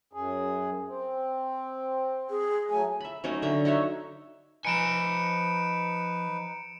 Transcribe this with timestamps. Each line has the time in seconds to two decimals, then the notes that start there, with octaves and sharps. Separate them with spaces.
0.13 F#2 G#4
0.87 C4
2.30 G#4
2.70 F#3 A3 G#5
3.01 E5 B5
3.24 F#3 A3 C#4 D#4
3.42 D3 E5 A#5
3.65 D#4 F#4 C#5 E5
4.65 F3 D#4 B4 G#5 C#7 D7 E7